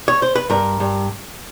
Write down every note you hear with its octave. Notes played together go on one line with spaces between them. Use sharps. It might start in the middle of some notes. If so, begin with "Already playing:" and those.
C#5
C5
B4
G2 A#4
G2